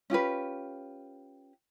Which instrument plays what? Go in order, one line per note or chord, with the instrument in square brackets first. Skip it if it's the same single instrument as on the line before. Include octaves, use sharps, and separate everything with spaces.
[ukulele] C#4 F4 G4 B4